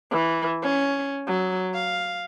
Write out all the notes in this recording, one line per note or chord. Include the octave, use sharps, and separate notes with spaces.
E3
C#4
F#3
F5